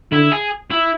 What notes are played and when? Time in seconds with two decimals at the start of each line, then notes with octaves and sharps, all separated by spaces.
0.11 D3 E4
0.32 G#4
0.71 E4